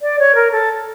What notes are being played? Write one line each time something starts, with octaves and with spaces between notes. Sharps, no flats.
D5
C#5
A#4
A4